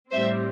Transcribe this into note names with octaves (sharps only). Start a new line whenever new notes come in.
A2 G3 C4 C5 E5